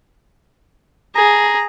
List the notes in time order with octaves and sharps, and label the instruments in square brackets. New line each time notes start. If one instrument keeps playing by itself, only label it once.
[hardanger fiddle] G#4 [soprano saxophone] A#5